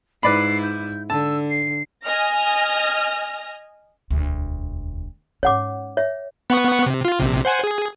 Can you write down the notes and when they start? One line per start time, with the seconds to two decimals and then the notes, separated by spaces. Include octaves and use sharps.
0.23 G#2 E4 B4 D5 B5 C7
0.63 G6
1.10 D3 A5 E6
1.50 C7
2.04 D#5 G#5 F6 A#6
4.11 E1 D2
5.43 G#2 C#4 C#5 F#5 D6
5.97 C#5 E5
6.50 B3 F#5 C#6
6.86 C3
7.05 F4
7.19 A#1 C3
7.45 C5 F#5 G#5
7.64 G#4